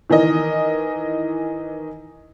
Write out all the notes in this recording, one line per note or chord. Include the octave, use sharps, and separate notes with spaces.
D#3 E3 A#4 D#5